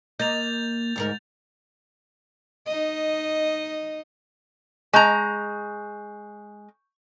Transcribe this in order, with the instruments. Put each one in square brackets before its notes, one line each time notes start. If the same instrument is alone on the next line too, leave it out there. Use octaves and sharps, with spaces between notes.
[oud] A#3 D#5 [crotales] G6 A6 F7
[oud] D2 G#2 A#4
[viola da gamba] D#4 D#5
[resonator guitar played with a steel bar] G#3 A#5 [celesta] C#6 G6